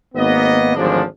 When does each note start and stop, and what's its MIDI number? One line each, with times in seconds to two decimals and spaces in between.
0.15 0.73 32
0.15 0.73 58
0.15 0.73 59
0.15 0.73 75
0.75 1.01 32
0.75 1.01 38
0.75 1.01 53
0.75 1.01 54
0.75 1.01 56
0.75 1.01 62